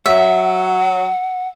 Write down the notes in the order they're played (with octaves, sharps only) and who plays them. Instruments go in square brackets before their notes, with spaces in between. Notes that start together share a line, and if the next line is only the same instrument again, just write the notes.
[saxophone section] F#3 [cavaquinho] E5 [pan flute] F#5